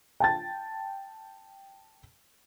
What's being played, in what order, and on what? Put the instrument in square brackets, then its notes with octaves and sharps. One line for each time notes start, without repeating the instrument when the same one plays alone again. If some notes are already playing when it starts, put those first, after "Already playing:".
[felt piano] G5 A5 A6